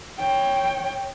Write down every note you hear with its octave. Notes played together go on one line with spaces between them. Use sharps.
C#5 G5